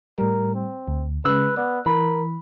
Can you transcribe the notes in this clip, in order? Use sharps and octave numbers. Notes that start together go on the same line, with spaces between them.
A2 G3 A#4
C4
D2
C#3 G#3 B4 E6 F#6
B3 D5
E3 A#4 B5